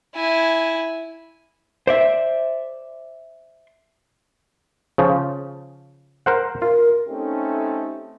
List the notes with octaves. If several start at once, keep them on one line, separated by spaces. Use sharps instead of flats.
E4 G#5
C5 D5 E5
C#3 F3
A#4 C5 F#5
F4 A#4
A3 C4 C#4 D#4 G4 A4